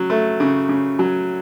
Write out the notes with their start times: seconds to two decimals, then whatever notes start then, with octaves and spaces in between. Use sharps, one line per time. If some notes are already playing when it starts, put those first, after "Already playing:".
Already playing: C#3 F#3
0.10 A3
0.40 C#3
0.69 C#3
0.99 F#3